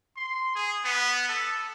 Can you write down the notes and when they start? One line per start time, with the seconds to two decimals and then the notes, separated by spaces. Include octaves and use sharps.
0.16 C6
0.55 G#4
0.84 B3
1.29 A4